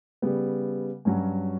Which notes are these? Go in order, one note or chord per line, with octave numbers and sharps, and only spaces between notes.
C#3 G3 B3
G2 F#3 C#4 F#4